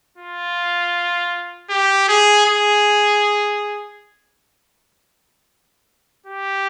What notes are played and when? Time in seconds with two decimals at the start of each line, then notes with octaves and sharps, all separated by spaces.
0.18 F4
1.70 G4
2.08 G#4
2.46 G#4
6.26 G4